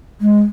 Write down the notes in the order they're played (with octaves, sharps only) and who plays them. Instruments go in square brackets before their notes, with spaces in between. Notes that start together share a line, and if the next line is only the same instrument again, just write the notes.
[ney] G#3